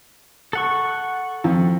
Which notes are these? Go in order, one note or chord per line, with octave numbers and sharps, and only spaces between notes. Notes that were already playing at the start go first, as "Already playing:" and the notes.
A4 F#5 C#6
F2